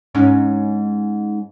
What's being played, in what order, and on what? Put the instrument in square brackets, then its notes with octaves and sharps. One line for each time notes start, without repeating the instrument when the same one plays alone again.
[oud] G#2 C#4 D#4